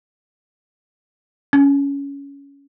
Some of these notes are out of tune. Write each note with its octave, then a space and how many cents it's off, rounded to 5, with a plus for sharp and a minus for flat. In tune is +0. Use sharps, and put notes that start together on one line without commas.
C#4 +15